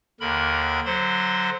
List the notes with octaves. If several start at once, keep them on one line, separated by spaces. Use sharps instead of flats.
D#2 D3 A#4 B5
D3 F#3 C5 C6